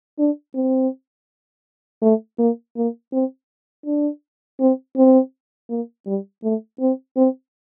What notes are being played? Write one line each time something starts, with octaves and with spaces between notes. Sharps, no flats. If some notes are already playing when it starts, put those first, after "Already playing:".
D4
C4
A3
A#3
A#3
C4
D4
C4
C4
A#3
G3
A3
C4
C4